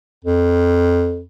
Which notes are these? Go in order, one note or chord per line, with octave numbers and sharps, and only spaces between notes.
F2